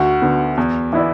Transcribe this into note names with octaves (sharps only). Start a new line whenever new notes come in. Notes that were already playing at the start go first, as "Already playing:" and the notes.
Already playing: D2 F#4
D3 B3
E2
E3 B3 E4 D5